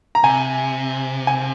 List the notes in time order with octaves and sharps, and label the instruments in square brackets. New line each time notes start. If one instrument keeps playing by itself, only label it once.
[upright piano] A#5
[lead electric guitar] C3 [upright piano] G#5
[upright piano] G#5